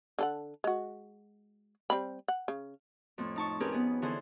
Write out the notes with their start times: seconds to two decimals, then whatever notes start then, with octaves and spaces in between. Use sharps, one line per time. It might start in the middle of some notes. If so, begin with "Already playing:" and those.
0.19 D3 A4 F#5
0.64 G#3 F#4
1.90 G3 C4 B5
2.28 F#5
2.48 C#3
3.18 F2 A2 C4
3.36 D#4 A5 C#6
3.60 C4 C#4 G4 G#4 A#4 B4
3.72 B3 G#4
4.02 D3 E3 C#4 G#4 A4 C5